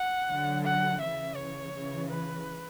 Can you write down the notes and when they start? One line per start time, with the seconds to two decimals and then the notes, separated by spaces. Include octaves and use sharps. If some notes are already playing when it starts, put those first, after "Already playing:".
Already playing: F#5
0.28 D3 F#3
0.64 F#5
1.00 C#3 E3 E5
1.36 C#5
1.72 C#3 E3
2.09 B4